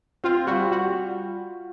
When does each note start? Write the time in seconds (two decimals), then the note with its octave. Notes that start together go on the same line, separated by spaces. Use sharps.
0.24 C4 F4
0.47 G3 F#4
0.71 G3 F#4